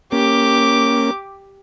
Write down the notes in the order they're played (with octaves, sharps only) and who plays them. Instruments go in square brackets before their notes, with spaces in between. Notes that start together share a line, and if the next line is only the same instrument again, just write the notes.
[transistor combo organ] A#3 C#4 [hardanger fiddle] G4 D6